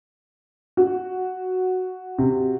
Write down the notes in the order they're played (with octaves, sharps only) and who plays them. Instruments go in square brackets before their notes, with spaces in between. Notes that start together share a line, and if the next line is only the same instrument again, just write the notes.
[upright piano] F#4
[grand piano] C3